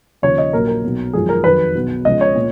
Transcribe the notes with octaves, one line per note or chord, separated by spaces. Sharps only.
D#2 C#3 F3 C#5
D#5
A#1 A#2 F#3 A#4
A#4
B1 B2 F#3
G#1 F#2 F3 G#4
A#4
F2 D#3 F#3 B4
B1 B2 F#3
C#2 C#3 F3 D#5
C#5
A#2